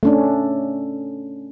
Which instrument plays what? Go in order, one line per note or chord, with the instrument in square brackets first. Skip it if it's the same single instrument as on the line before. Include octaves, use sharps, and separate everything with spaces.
[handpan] A3 C#4 D4